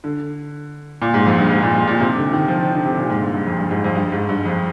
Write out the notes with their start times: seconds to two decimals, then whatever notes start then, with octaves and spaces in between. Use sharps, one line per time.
0.04 D3
1.02 A#2
1.14 G#2
1.26 F2
1.39 G2
1.51 G#2
1.63 A#2
1.75 G2
1.87 A#2
2.00 C3
2.16 D3
2.33 D#3
2.48 F3
2.61 D#3
2.73 D3
2.85 C3
2.98 A#2
3.09 G#2
3.22 G2
3.34 G2
3.47 F2
3.58 G2
3.71 G#2
3.84 F2
3.95 G2
4.12 G#2
4.29 G2
4.45 F2